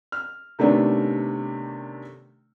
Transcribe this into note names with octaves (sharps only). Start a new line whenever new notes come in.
F6
C3 D#3 A3 B3 C#4 D4